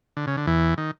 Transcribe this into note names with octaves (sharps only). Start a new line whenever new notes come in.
D3
C#3
D3
E2 E3
D#3